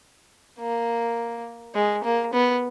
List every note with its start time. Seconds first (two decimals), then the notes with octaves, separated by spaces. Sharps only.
0.60 A#3
1.75 G#3
2.04 A#3
2.33 B3